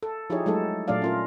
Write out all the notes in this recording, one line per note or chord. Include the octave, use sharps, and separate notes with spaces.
A4
F3 D#4 E4 G4 G#4 C#5
F#3 G#3 A3 D#4 A4
A#2 F#3 A3 D4 D5 F5
C#4 F4 A#4